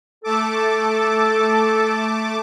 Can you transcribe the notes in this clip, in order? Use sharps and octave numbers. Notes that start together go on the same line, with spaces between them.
A3 A4 A5 D6